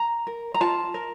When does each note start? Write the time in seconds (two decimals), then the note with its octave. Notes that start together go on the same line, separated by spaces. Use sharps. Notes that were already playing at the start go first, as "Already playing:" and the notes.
Already playing: A#5
0.27 A#4
0.54 A#5
0.60 F4 A5
0.94 A#4